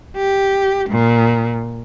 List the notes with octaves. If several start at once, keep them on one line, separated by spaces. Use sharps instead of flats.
G4
A#2